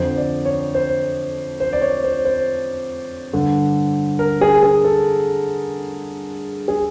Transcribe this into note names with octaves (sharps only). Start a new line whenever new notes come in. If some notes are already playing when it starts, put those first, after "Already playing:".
Already playing: F2 D3 C5
D5
C#5
C5
C5
D5
C#5
C5
C5
G2 D3
A#4
G#4
G#4
A4
G#4